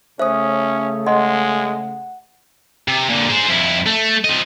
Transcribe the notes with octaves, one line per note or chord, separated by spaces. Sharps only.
C#3 A3 C#4 C5 E5 D#6
G#3 D#5 F#5 C6
C3
A#2 D3
G#4 C5
F2 E4
A3
C4 D#5